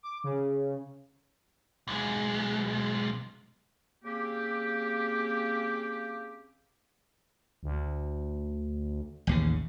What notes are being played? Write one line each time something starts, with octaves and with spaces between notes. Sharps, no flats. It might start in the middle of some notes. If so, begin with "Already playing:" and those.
D6
C#3
B1 G#3
C#3 A#3 C4 G4
D2
A1 D#2 C#3